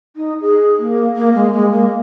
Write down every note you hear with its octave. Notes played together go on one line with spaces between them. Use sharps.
D#4
G#4
A#3
A#3
G#3
G#3
A#3